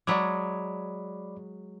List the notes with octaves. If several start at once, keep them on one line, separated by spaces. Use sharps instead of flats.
F#3 G#3 D5 B5 D6